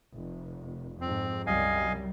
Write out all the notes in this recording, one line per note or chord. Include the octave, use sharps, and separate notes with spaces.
F1
F2 G#2 C4
C2 F#2 G3 D#5 F5 G#5